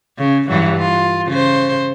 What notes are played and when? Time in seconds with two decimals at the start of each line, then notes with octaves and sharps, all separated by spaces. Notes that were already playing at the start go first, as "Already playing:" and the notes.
0.18 C#3
0.48 G2 E3 F#3
0.77 F4
1.27 C#3 C5